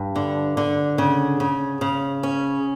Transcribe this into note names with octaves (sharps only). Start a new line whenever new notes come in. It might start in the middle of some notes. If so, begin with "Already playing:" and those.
Already playing: G2
D3
D3
C#3
C#3
C#3
C#4